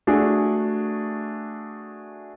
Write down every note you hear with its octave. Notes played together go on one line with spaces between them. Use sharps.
A3 D4 F#4 G#4